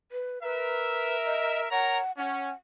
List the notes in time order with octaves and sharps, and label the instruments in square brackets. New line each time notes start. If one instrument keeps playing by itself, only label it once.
[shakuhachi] B4
[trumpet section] A#4 E5 [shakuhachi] B4
[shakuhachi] D#5
[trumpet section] A#4 C#5 A#5 [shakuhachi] F#5
[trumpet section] C#4 [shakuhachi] F#5